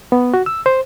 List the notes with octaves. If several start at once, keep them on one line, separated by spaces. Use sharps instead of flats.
B3
F#4
E6
C5